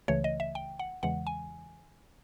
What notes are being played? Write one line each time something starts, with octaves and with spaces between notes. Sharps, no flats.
C#2 C#3 E3 A3 C#5
D#5
E5
G5
F#5
E2 C#3 E3 G#3 F#5
G#5